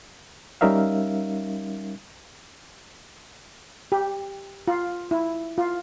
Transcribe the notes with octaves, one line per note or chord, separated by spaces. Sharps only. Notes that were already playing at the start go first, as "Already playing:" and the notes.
G3 C#4 D#4 A#4 E5 F5
G4
F4
E4
F4